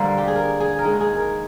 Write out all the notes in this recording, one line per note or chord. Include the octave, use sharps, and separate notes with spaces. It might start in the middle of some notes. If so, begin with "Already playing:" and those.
Already playing: D3 G3 A#3 A#4 C5
G4
G#4
A#4
G#4
A#4
D#3 G#3 G#4
G#4
A#4